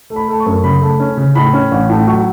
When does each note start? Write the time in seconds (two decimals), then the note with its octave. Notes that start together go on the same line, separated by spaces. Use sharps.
0.10 A3
0.16 B5
0.28 A3
0.40 C#6
0.46 F#2
0.64 C#3 B5
0.81 A3
1.00 C#4
1.17 C#3
1.35 A2 B5
1.53 C#4
1.72 A1
1.89 A2
2.07 F#3 C#6